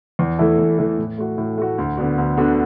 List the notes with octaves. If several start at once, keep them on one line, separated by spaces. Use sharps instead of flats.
E2
E3 A3 E4 A4
E2
E3 A3 E4 A4
A2
A3 F#4
A2
A3 F#4
D2
D3 B3 D4 F#4
D2
D3 B3 D4 F#4